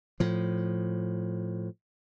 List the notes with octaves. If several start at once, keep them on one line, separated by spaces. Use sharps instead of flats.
A2 F3